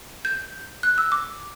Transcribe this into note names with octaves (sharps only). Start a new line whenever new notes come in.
G6
F#6
E6
D6